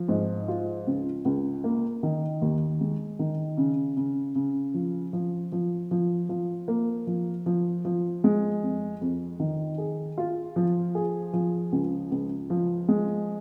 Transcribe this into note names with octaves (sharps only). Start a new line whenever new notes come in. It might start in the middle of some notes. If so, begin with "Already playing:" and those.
Already playing: F3
G#2
F4
C#2
C#2
A#3
D#3
D#2
G#3
D#3
C#3
C#3
C#3
F3
F3
F3
F3
F3
A#3
F3
F3
F3
G#3
F2
F2
D#3
G#4
F4
F3
G#4
F3
C#2
C#2
F3
G#3